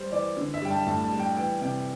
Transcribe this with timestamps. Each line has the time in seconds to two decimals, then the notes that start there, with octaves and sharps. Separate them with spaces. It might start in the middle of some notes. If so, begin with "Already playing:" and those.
Already playing: G3 C5
0.12 E3 D5
0.37 D3
0.54 E5
0.62 G3 G5
0.70 A5
0.87 A2 A5
1.03 A5
1.12 G3
1.20 G5
1.36 E3 G5
1.61 C3 G5